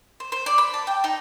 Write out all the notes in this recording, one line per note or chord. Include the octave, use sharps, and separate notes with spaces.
C5
C5
D5
B5
A5
G5
D#4